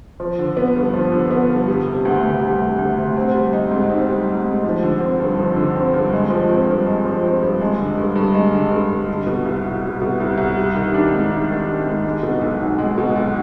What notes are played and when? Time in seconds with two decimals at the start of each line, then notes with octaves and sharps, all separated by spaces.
0.20 F3
0.39 D3
0.57 B3
0.76 G2
0.93 F3
1.12 D3
1.31 B3
1.50 G2
1.68 G3
1.87 C3
2.05 D2
2.23 D2
2.41 G3
2.61 C3
2.78 D2
2.98 D2
3.17 C4
3.35 G3
3.53 D#4
3.71 G#2
3.89 C4
4.09 G3
4.27 D#4
4.45 G#2
4.64 F3
4.83 D3
5.01 C4
5.20 G2
5.39 F3
5.56 D3
5.75 C4
5.94 G2
6.13 G#3
6.30 F3
6.49 C4
6.67 G2
6.86 G#3
7.05 F3
7.23 C4
7.42 G2
7.61 G#3
7.79 D3
7.98 G2
8.16 G2
8.34 G#3
8.53 D3
8.71 G2
8.90 G2
9.09 G3
9.27 B2
9.46 C2
9.65 C2
9.83 G3
10.02 B2
10.20 C2
10.38 C2
10.57 G3
10.76 D#3
10.94 D4
11.12 G#2
11.30 G3
11.50 D#3
11.67 D4
11.87 G#2
12.05 G#3
12.23 B2
12.41 B1
12.61 B1
12.78 G#3
12.98 B2
13.16 B1